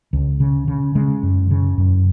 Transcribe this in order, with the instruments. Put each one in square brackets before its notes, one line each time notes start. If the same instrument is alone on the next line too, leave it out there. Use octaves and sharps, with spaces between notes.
[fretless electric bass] C#2
C#3
C#3
C#3 G#3
F#2
C#3
F#2